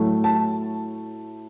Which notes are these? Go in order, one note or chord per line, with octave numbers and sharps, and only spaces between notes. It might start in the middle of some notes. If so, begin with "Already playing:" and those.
Already playing: A2 F#3 A3
A5